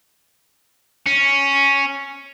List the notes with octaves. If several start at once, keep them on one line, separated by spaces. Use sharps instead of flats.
C#4